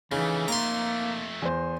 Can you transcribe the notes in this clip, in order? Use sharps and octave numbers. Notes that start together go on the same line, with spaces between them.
F2 C#3 E3 A3 D#4
A#3 A#5 C6
E2 C5